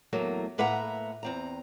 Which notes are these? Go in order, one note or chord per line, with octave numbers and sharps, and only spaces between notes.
E2 F#3 A3 A#3
A2 A#3 B4 E5 F#5 A#5
E2 C4 A#5